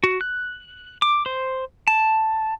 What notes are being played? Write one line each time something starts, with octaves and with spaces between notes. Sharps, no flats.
F#4
F#6
D6
C5
A5